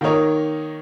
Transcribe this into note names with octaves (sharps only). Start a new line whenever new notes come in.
D#3 A#3 D#4 A#4 C#5